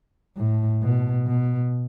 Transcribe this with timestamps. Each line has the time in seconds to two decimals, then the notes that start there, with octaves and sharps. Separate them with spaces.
0.37 A2
0.83 B2
1.27 B2